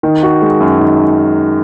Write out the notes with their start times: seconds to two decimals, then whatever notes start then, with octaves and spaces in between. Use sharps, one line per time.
0.03 D#3
0.23 F#4
0.42 G#3
0.60 F#2
0.80 D#3